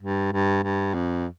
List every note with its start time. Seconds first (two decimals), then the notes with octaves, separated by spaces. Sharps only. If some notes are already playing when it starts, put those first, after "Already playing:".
0.02 G2
0.33 G2
0.64 G2
0.94 F2